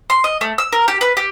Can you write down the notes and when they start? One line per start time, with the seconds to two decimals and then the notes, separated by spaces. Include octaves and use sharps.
0.10 C6
0.24 D#5
0.41 A3
0.58 E6
0.73 A#4
0.88 G4
1.01 B4
1.17 G4